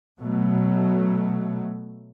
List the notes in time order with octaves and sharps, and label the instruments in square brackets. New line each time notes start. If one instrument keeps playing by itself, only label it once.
[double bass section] B2 F#3 A3